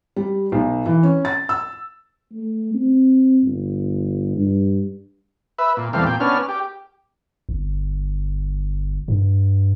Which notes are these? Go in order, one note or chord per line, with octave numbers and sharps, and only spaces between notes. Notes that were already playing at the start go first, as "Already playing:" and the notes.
G3
B1
E3
C#4
A6
E6
A3
C4
G1
G2
B4 E5
A#2
E2 C3 G3 A3 F5
A#2 G5
B3 C#4 D4 F6
G4
G1
G2